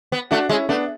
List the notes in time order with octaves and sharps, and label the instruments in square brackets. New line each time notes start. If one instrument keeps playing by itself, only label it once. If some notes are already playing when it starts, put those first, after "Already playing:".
[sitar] B3
[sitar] A3 [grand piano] D4 F#4
[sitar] G#3 [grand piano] C#4 E4
[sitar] A3 [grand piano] B3 D4